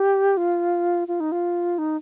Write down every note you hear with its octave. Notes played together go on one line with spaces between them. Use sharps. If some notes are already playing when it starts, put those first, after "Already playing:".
Already playing: G4
F4
F4
D#4
F4
D#4